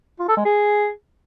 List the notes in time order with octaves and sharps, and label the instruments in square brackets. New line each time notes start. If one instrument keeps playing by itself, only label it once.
[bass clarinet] F4
A4
G#3
G#4